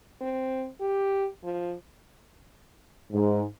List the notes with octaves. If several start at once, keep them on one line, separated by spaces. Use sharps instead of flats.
C4
G4
F3
G#2